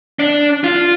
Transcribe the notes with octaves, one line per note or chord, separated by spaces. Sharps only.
D4
F4